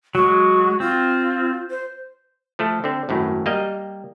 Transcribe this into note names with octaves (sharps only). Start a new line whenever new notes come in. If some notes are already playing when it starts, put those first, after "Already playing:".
F#3 G#3 F#4
C4 F4
C5
F3 A3 A4
D3 C4
G#1 F#2 A2
G3 A#3 D#5